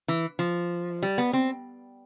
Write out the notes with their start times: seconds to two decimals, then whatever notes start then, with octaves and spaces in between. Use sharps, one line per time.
0.08 E3
0.39 F3
1.03 G3
1.18 B3
1.33 C4